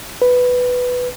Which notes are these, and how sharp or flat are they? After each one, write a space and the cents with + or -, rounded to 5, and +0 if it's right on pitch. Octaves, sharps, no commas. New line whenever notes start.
B4 +5